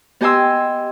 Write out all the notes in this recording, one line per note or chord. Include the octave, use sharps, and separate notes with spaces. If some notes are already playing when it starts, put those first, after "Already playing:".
B3 G4 D#5 G#5 C6 E6